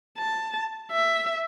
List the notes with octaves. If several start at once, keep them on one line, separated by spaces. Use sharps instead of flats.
A5
E5